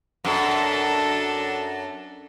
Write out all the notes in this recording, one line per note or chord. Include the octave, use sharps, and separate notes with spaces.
F#2 D4 A4